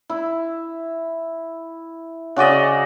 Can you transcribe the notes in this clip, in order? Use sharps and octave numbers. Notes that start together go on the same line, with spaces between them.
E4
C#3 F#4 D5 D#5